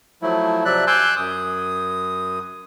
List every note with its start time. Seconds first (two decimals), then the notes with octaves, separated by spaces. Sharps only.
0.22 F3 F#3 A3 E4
0.65 C3 F3 F#3 D5 E5 F#6
0.87 G#5 C6 D6 E6 F#6 G6
1.17 F#2 D#6